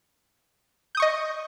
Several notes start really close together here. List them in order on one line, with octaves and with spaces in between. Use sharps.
G6 D#6 C#6 D#5